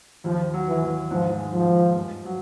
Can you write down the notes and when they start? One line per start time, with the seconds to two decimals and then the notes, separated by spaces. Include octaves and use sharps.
0.24 D#2 F3
0.54 F#3
0.68 E3
0.82 D#2
1.11 G#2 F3
1.39 G#3
1.53 F3
1.68 G#2
1.96 G2
2.25 F#3